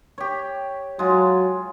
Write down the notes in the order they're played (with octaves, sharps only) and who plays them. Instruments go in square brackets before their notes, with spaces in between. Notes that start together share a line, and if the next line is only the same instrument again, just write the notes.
[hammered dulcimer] G4 C#5
[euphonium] F#3 [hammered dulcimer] G#3 F4